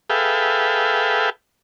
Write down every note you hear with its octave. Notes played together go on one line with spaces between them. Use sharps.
G#4 A4 B4 E5 F5 G5